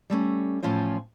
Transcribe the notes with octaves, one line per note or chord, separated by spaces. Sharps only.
G3 A3 A#3 C#4
E2 A2 F3 C#4 F4 C5